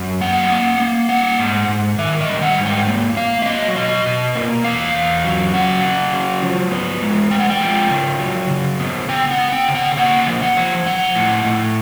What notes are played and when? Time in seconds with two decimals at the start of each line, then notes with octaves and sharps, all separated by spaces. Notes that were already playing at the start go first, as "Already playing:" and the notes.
Already playing: F#2
0.21 A#3 F#5
0.50 A#3
0.80 A#3
1.09 G3 F#5
1.39 G#2
1.68 G#2
1.98 D#3 E5
2.21 D#5
2.29 G3
2.42 F#5
2.57 G#2
2.65 G5
2.87 A#3
3.16 A#3 F5
3.42 E5
3.46 F#3 D#5
3.76 B2 D#5
4.06 B2
4.35 A#3
4.64 E2 F5
4.94 E2
5.24 F#3
5.54 C#3 F#5
5.83 C#3
6.13 F#3
6.42 F3
6.71 B3
7.02 G#3
7.31 G#3 G5
7.40 F#5
7.50 G5
7.60 F3
7.90 C#3
8.20 F#3
8.50 C#3
8.80 B3
9.09 B3 G5
9.31 F#5
9.38 B3
9.52 G5
9.68 C#3
9.75 F#5
9.97 A#3 F#5
10.27 F3
10.42 F#5
10.57 F3
10.86 F3 F#5
11.16 A2
11.45 A2